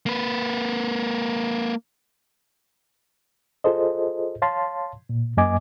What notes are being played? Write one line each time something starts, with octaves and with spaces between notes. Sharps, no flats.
A#3 B4
F4 G#4 A4 C5 D#5
C#5 F5 A5 C6
A#2
F#2 A#3 D#5 G#5 D6